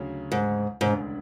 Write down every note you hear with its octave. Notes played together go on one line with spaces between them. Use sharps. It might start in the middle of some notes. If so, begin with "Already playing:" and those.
Already playing: D2 C#3 F#3
G#2
E1 D2 G#2 C#3 G#3 D4